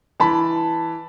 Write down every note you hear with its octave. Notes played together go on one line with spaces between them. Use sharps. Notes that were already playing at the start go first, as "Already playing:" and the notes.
E3 A5 B5